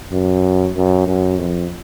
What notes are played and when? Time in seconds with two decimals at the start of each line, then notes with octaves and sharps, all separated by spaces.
0.12 F#2
0.77 F#2
1.07 F#2
1.39 F2